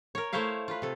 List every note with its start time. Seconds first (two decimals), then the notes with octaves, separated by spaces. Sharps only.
0.15 A#4 C#5
0.33 A3 E4 C5 C#5 E5 F5
0.68 F4 B4
0.82 C3 A4